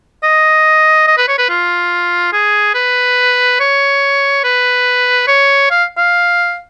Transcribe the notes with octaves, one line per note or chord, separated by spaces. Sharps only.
D#5
D#5
B4
C#5
B4
F4
G#4
B4
C#5
B4
C#5
F5
F5